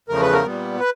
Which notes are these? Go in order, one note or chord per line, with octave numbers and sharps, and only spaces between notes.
E2 C#3 F3 A3 A#4
B4
A#4
A#2 G3 B3
B4